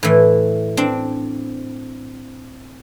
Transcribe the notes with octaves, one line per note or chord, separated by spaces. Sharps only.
A2 E3
C4 D4